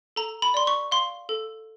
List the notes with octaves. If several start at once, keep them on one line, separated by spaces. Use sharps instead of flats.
A4 A#5
B5
D5 C6
C#6
F5 C6
A4